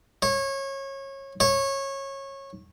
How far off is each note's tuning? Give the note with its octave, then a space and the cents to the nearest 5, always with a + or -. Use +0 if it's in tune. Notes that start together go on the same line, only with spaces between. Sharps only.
C#5 -25
C#5 -20